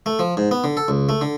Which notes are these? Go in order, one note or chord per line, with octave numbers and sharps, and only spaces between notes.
A3
F3
G#2
B3
D3
A4
C#2
A3
D3